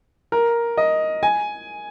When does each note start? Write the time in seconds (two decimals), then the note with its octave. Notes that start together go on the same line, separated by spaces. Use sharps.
0.32 A#4
0.77 D#5
1.23 G#5